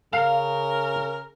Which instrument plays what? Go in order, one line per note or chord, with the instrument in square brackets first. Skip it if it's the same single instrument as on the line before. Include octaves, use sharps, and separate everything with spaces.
[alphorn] C#3 [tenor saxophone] A#4 [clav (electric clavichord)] F5